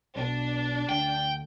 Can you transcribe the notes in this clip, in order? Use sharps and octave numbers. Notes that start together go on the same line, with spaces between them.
B1 B2 D4
D2 G5